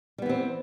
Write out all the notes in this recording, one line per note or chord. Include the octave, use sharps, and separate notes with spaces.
E3 G3 B3 C4